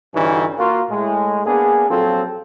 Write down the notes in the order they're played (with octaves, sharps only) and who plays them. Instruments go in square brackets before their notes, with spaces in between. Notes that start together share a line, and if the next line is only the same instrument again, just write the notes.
[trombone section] G2 D3 E3 C#4 D#4 F#4
A#3 F4 F#4
A2 G#3
A#3 B3 D4 G#4
A#1 F#3 C4 F4 A4